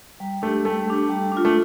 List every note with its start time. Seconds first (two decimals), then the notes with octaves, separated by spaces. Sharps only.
0.20 G3
0.42 A3 D4 G4
0.65 G3 A3
0.88 D4 G4
1.09 G3
1.32 D4 F4
1.45 A3